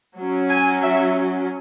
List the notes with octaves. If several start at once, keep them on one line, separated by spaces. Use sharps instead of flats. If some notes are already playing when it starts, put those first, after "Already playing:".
F#3 C#4
G#5
E5